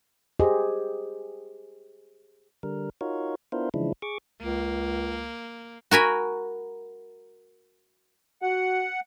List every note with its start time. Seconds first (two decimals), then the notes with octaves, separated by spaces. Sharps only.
0.39 G4 G#4 C5 D#5
2.63 D3 G3 A#4
3.01 D#4 F4 F#4 A#4 C#5
3.52 B3 D4 E4 F4 A#4 C5
3.74 C#3 E3 F3 G#3 D4 E4
4.02 G#4 C#6 D6
4.42 C#2 A#3
5.91 F#4 A#4 G#5 B5
8.42 F#4 F#5